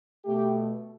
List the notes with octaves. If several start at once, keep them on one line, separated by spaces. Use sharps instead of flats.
B2 A3 G4